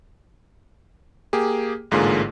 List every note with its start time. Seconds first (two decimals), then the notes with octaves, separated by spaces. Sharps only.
1.33 A#3 G4 G#4
1.91 A1 G#2 D3 A#3 F4 G#4